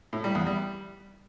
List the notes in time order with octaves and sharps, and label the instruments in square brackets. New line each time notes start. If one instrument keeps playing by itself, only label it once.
[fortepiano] A2
G3
E2
G3